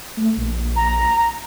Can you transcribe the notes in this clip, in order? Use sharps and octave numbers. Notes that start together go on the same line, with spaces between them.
A3
A#1
A#5